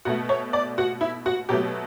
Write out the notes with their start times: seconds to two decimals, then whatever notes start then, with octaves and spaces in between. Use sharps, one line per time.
0.05 B2 A3 F#4
0.29 C#5
0.53 D5
0.78 F#4
1.01 E4
1.26 F#4
1.49 B2 F#3 A3 G4